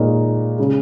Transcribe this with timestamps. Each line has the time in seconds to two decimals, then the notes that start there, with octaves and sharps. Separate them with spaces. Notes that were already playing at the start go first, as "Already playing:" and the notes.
Already playing: A#2 G#3 D#4 A#4 C#5
0.58 C#3 G#3